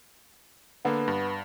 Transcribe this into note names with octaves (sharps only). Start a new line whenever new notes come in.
D3 A#3 B3
G2